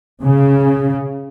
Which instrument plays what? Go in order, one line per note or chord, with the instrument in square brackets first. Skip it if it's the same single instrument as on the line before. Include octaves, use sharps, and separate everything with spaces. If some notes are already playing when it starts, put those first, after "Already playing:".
[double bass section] C#3